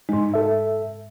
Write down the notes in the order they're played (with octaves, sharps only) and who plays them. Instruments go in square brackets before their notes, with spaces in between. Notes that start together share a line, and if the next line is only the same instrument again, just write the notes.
[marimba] G#2 G#3 [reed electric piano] D#4
[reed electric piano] A4 E5